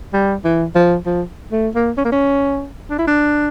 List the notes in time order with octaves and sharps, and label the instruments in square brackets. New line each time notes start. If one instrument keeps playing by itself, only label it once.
[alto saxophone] G3
E3
F3
F3
A3
A#3
C#4
A#3
C#4
D4
E4
D4